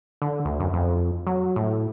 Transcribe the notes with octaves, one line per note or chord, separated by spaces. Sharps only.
D3
D2
F#2
F2
F#3
A2